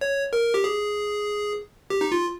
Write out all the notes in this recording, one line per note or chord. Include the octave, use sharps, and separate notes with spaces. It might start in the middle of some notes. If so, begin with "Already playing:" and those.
C#5
A#4
G4
G#4
G4
D#4
F4